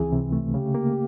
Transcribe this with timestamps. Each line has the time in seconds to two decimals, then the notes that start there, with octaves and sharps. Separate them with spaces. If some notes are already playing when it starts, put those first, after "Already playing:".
Already playing: C#2 E3 C4 G#4
0.13 C3
0.32 A3
0.54 C#3 G4
0.75 A#3